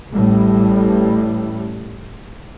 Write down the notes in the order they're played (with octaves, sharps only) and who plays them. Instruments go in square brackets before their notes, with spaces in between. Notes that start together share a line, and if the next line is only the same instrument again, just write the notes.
[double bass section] A1 A2 G3